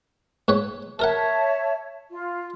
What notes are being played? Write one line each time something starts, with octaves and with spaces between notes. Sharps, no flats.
G#2 B4 C#5
A4 A#4 C#5 E5 F#5 A5
F4